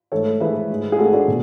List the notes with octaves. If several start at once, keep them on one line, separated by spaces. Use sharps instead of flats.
G#2 E3 A3 A4 C#5
G#2 E3 A3 G#4 B4
G#2 G#3
G#4
G#2 G#3 F#4 A4
D4 F#4
B2